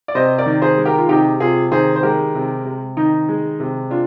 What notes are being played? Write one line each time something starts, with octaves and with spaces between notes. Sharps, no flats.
D5
C3 C5 D#5
A#4 D5
D#3
G#4 C5
G#3
G4 A#4
F4
C3 D#4 G4
C3 F4 G#4
D#3 G#4 C5
C5
G#3 G4 A#4
C3
C3
D#3 D#4
G#3
C3
D4 F4